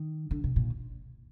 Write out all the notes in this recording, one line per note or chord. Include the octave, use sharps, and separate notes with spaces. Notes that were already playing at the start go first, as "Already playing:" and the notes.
Already playing: D#3
D3
C3
A#2